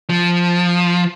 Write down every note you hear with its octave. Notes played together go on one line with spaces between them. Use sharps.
F3